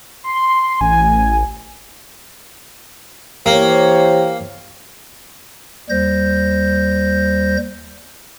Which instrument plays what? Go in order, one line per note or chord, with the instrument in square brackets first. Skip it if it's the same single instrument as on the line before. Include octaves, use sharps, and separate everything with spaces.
[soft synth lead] C6
[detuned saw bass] A1 [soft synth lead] G#5
[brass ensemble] E3 C5 C#5 [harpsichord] A#3 [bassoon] G4
[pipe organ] D#2 G3 C5 G6 A#6